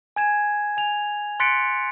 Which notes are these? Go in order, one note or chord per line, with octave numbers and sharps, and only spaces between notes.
G#5 G#6 E7
G#5 F7
C6 F#6 A6 B6 C#7 D7